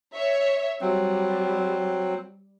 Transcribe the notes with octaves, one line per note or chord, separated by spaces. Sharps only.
C#5 E5
F#3 G3 C4